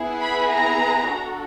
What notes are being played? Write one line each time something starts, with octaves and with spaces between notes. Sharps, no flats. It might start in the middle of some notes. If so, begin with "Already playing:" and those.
Already playing: B3 E4 G#4
B5
A#5
D4 F#4 A4